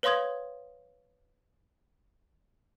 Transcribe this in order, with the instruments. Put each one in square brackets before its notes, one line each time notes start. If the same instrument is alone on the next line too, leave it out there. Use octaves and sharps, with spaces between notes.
[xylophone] B4 C#5 F5 C6 D#6 G#6